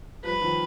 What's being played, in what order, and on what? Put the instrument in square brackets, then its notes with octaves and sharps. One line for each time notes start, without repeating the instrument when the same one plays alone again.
[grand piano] F3 G3 [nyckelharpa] B4
[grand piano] D#3 F3